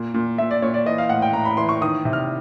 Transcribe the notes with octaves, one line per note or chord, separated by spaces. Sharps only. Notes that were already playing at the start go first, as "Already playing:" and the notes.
Already playing: A#2
A#2
A#2 E5
D5
A#2 C#5
D5
E3 D#5
F5
A2 F#5
G5
A2 A#5
B5
E3 C6
C#6
D#3 D#6
C3
F6